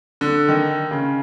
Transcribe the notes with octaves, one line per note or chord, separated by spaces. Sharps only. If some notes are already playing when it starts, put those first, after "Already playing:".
D3
D#3
C#3